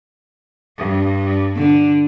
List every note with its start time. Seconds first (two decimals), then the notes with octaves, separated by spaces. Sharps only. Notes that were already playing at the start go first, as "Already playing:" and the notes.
0.78 G2
1.57 D3